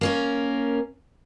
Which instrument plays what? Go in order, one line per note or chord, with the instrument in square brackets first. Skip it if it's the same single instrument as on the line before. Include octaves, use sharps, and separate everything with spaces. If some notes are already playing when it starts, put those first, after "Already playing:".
[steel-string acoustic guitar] A#3 C#4 A#4